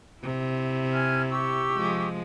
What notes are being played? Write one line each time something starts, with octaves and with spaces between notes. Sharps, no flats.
C3 E4
G#5 F6 G#6
G4 C#6 E6
F3 G#3